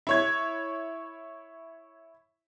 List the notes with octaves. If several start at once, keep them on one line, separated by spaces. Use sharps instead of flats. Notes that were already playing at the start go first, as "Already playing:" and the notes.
E4 C#5 G#6